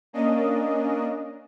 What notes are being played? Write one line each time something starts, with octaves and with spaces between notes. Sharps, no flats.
A#3 C#4 D4 D#5